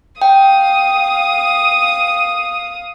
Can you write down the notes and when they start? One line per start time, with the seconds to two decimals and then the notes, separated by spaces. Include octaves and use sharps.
0.22 F5 G5 D#6